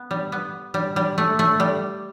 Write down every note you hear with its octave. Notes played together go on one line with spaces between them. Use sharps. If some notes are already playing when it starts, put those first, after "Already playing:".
Already playing: B3
G3
B3
G3
G3
A3
A3
G3